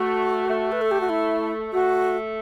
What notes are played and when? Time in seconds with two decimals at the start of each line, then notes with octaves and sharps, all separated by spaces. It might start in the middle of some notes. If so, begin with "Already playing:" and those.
Already playing: A3 F#4
0.48 A3
0.72 B4
0.81 A4
0.91 G4
1.01 F#4
1.09 E4
1.73 A3 F#4